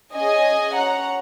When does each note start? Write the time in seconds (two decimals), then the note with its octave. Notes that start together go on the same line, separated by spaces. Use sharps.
0.14 C#4 G#4 D#5 G#5
0.75 C#4 F#4 F#5 A#5